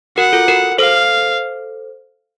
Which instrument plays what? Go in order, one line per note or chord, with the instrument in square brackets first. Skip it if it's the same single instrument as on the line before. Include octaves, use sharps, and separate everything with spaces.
[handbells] F#4 A#4 [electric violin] F#5
[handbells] F4 A4
F#4 A#4
[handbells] A4 C5 [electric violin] F5